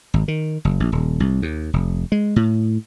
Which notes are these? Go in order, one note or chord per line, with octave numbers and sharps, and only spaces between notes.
G#1
D#3
F#1
A#1
D#1
C2
D#2
F1
G#3
A2